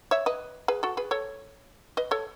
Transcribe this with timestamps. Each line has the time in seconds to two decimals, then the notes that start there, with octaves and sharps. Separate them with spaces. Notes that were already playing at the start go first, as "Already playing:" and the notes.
0.11 C#5 E5
0.26 B4 D#5
0.68 G#4 B4
0.83 F#4 A4
0.97 G#4 B4
1.11 A4 C#5
1.97 B4 D#5
2.11 A4 C#5